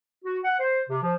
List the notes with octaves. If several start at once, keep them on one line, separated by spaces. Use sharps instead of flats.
F#4
F#5
C5
C3
F3